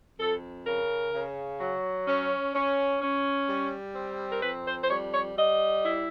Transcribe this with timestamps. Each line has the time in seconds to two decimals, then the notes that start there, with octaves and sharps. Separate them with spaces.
0.19 F2 A4
0.66 C#3 A#4
1.13 C#3
1.60 F#3
2.07 C#4
2.54 C#4
3.01 C#4
3.49 G3
3.96 C4
4.31 A#4
4.42 F2 B4
4.66 C5
4.83 C5
4.89 G3 C#5
5.13 C#5
5.37 G3 D#5
5.83 E4